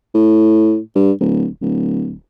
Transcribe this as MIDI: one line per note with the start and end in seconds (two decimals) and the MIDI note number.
0.14 0.78 45
0.95 1.12 43
1.20 1.47 26
1.61 2.16 26